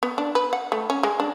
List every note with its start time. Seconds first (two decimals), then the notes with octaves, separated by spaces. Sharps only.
0.03 B3
0.18 D4
0.35 B4
0.53 F#5
0.72 A3
0.90 C#4
1.03 G#3
1.20 D4